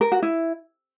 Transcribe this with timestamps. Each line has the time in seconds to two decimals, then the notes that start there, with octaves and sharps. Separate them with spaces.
0.01 A#4
0.12 F#4
0.23 E4